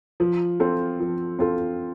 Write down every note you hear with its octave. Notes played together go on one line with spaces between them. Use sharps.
F3
C4 F4 A4
F3
C4 F4 A4